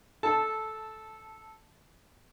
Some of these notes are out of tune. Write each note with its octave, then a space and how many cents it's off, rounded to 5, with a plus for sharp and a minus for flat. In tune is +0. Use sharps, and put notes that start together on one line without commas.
A4 -10 A5 +0